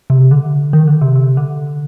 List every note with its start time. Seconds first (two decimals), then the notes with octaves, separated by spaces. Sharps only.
0.10 C3
0.31 D3
0.73 D#3
0.88 D3
1.01 C3
1.16 C3
1.37 D3